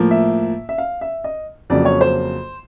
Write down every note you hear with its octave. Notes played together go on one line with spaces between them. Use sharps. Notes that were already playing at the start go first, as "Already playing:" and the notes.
Already playing: A2 F3 A#3
E5
E5
F5
E5
D#5
F2 C#3 F#3 A#3 D5
C#5
C5